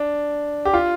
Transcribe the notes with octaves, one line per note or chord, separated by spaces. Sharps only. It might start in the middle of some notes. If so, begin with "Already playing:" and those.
Already playing: D4
G4
F4